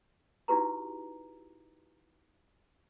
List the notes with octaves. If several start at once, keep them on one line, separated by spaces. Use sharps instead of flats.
D#4 E4 F#4 G4 B4 A#5